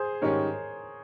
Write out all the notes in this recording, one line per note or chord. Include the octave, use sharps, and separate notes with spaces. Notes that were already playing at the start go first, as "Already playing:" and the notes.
Already playing: G#4 C5
G#2 D#3 G3 C#4 G4 A#4 C#5